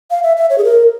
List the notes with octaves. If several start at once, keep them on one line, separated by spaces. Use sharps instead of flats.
F5
E5
E5
C#5
G#4
A#4